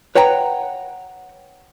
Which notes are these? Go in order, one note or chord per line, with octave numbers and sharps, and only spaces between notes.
B4 C#5 F#5 G5 A#5